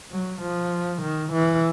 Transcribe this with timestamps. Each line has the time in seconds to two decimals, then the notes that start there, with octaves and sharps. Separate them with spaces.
0.12 F#3
0.42 F3
1.02 D#3
1.32 E3